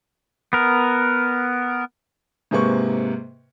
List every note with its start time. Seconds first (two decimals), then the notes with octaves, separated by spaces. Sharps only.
0.53 B3 A#4
2.51 G#2 C3 A#3 B4 C#6